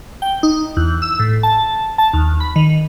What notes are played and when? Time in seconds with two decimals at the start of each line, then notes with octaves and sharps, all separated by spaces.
0.22 G5
0.43 D#4
0.77 E2
1.02 E6
1.19 A2
1.43 A5
1.98 A5
2.13 D#2
2.40 B5
2.56 D#3